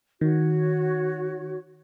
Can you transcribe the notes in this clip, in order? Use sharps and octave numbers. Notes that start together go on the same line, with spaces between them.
D#3 F#4 C#5